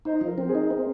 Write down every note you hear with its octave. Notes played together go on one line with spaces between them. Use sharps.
D#4 C5
F3
A#4
C4
G#4
D#4
C4 G#4